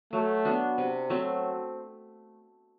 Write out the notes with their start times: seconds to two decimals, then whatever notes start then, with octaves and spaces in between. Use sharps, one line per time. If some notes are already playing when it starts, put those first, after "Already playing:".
0.13 F#3 A3
0.45 B3 D4 F#4
0.78 C3
1.10 F#3 A3 C4